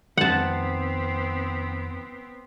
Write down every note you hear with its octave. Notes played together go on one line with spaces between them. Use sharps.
F2 D#3 B3 C4 F#5 A5